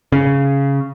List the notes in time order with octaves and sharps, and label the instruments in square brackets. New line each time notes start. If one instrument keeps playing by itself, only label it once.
[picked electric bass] C#3